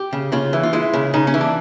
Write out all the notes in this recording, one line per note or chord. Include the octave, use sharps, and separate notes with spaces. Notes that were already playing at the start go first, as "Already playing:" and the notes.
Already playing: G4
C#3
C#3 F4
E3
F4
G#3 E4
C#3
C#3 D#4
C#4
E3
D4